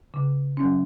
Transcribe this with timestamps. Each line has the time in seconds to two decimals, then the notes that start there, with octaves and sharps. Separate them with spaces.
0.14 C#3
0.57 F#3 C#4